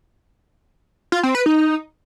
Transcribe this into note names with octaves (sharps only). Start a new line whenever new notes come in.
F4
C4
B4
D#4